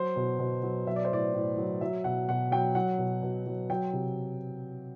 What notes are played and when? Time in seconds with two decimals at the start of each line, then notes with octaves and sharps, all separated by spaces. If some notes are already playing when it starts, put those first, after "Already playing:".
Already playing: F#3 C5
0.16 B2
0.39 B2
0.63 F#3
0.86 F#3 E5
0.96 D5
1.05 C5
1.10 A2 D5
1.34 A2
1.57 F#3
1.81 F#3 E5
2.04 B2 F#5
2.29 B2 F#5
2.51 F#3 G5
2.75 F#3 F#5
2.99 B2
3.23 B2
3.46 F#3
3.70 F#3 G5
3.93 C3